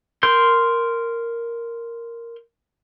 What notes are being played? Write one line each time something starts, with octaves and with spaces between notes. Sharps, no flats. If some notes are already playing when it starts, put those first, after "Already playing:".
A#4 C6 G6